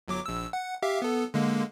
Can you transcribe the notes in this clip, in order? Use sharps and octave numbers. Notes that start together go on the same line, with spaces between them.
G1 F#3 D6
A#1 E6
F#5
G4 E5 F5
B3 A4
D3 G#3 A#3